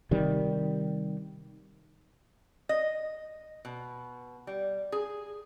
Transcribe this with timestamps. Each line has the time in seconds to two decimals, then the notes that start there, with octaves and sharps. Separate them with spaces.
0.11 C3 D#3 G3
2.69 D#5
3.65 B2
4.47 G3
4.92 G#4